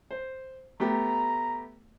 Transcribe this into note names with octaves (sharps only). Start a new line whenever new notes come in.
C5
A3 B3 G4 A#5